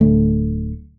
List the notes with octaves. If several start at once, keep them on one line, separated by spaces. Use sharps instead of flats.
D1 D3 A3